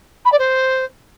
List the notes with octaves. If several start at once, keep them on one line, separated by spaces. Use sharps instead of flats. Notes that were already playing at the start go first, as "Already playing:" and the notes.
B5
D5
C5